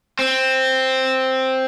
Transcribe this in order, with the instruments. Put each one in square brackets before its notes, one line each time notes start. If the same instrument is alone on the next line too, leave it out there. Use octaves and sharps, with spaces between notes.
[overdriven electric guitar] C4